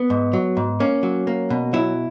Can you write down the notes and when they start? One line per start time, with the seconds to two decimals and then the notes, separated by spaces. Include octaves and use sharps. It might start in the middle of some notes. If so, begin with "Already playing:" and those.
Already playing: B3
0.10 G#2
0.33 F#3
0.57 G#2
0.80 A#3 C#4
1.03 F#3
1.27 A#3
1.50 B2
1.73 F#3 E4